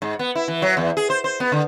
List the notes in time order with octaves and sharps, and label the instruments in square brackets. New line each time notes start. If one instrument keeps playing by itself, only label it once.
[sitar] G#2
B3
E4
E3
F#3
E2
G#4
C5
C5
B3
D3